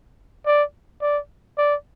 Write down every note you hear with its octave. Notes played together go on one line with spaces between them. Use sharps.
D5
D5
D5